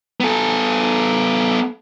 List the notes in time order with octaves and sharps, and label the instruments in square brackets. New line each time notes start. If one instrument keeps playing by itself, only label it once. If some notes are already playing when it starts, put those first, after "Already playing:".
[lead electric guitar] B3 A4